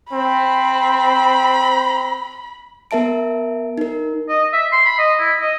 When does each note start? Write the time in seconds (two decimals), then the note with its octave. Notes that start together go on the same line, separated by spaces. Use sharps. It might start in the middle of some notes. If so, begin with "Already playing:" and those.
0.13 C4 B5
2.91 B3 A#4 E5 A5 D7
3.78 D#4 A#4
4.29 D#5
4.53 E5
4.72 C6
4.85 B5
4.98 D#5
5.20 E4
5.41 D#5